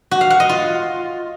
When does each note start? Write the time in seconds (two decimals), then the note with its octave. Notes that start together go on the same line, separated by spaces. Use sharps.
0.11 F#4
0.21 F5
0.30 F#5
0.40 D#5
0.49 F4